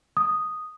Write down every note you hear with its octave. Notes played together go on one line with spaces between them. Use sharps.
D#6